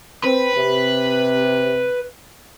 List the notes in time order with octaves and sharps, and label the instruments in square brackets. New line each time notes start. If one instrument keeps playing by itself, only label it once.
[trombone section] C4 [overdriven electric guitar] B4
[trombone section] C3